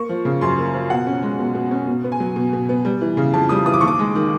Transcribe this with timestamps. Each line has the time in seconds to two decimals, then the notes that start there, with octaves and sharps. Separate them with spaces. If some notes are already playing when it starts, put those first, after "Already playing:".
Already playing: A#3 C#6
0.09 F3
0.25 C#3
0.41 F#2 C6
0.58 A#3
0.73 F3
0.90 B2 F#5
1.07 C#4
1.22 G#3
1.39 B2
1.55 B2
1.71 C#4
1.87 B2
2.04 B3
2.12 G#5
2.20 F#3
2.36 B2
2.53 B2
2.69 B3
2.85 G3
3.01 E3
3.17 C#3
3.33 F2 A5
3.49 G3 D#6
3.66 E3 D#6
3.74 D6
3.81 D#2 C#6
3.88 D6
3.99 G#3
4.15 D#3